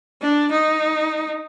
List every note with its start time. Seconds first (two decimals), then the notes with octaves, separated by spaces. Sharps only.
0.22 D4
0.51 D#4